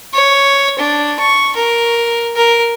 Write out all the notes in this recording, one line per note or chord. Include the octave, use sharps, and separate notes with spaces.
C#5
D4
C#6
A#4
A#4